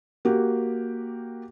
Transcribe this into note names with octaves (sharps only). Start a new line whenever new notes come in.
A#3 F#4 G4